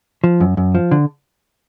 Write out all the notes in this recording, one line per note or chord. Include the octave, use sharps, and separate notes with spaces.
F3
F#2
F#2
F3
D3